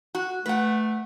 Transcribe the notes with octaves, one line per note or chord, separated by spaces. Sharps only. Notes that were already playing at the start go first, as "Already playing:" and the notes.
F#4
A3 B4 F#5